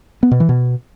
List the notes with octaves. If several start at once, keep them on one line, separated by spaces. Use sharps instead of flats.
B3
B2
E3
B2